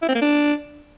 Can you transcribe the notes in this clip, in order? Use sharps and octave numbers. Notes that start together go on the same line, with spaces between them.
E4
C4
A#3
D4